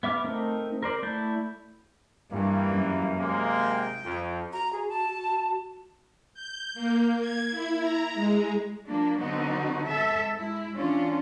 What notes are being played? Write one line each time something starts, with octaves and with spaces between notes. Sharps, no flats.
B3 E5 D6 F6
A3 C4 D#4 A#4
A#4 C5 D5
A3 E4 D5 G6
G2 E3 G3 A#3
F#2
C3 G#3 A#3
G5
F2
F#4 A#5
G#4
A5
G6
A#3
G#6
E4
A#5
G#3
F3 A#3 D4
D3 F#3 B3 C4 D#4 F#4
G#2 A4 E5
G#3 E4
E3 C#4 D4 F4